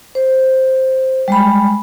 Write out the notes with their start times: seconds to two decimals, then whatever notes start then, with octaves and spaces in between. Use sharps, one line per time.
0.15 C5
1.28 G3 G#3 B5